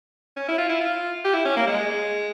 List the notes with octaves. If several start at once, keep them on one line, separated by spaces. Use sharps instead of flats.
C#4
E4
F4
E4
F4
G4
E4
C#4
A#3
G#3